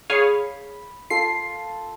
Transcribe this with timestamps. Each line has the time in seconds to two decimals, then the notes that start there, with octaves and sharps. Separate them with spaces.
0.10 G#4 C#5 F5 B5
1.10 F4 A4 C7